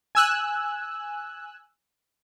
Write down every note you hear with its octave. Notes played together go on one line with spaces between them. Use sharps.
G#5 E6 F#6